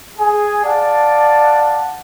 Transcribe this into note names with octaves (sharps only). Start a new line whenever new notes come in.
G#4 G#5
D5 F5 F#5 A5